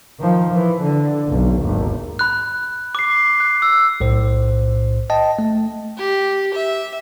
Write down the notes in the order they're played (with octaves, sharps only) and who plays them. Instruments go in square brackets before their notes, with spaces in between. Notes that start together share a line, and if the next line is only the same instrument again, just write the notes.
[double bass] D#3 F3
E3
D3
F#1 B1
G#1 D#2
[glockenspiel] B5 F#6
D6 C7
F#6
E6
[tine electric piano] B1 A2 C5
D#5 G5 A5
A3
[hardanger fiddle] G4
E5